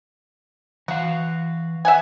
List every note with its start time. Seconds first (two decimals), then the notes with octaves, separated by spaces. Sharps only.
0.88 E3 F#4 F5
1.85 E5 F#5 G#5